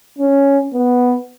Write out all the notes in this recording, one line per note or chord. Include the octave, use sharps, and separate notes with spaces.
C#4
B3